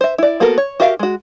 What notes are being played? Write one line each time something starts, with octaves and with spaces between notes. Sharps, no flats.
C5 E5
E4 D5
A#3 B3 F#4 A4 A#4
C#5
F#4 G4 A#4 E5 F5
G#3 F#4